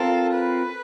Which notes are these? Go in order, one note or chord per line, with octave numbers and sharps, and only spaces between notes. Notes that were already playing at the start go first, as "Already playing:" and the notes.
Already playing: C4 F4 A4 A#4
B4